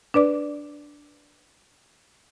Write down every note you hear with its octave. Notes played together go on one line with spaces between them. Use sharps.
D4 B4 D5 D6